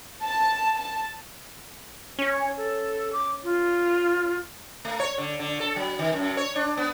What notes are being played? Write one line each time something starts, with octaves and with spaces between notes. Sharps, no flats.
A5
A5
C#4 C#5
A4
D6
F4
A3
C#5
D3
D3
A4
F#3
D#3
F#2
C#5
D4
B3